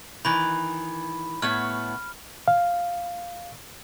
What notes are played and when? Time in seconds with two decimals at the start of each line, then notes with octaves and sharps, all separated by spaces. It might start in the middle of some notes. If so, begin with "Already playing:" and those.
0.25 D#3 E3 B5
1.42 A2 B3 C#5 F6
2.48 F5